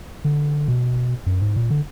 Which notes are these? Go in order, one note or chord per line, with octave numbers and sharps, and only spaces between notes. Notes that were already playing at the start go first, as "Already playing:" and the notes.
D3
B2
F#2
G#2
A#2
D3